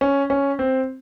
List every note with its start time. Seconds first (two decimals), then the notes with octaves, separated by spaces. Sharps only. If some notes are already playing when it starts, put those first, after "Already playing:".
0.01 C#4
0.30 C#4
0.59 C4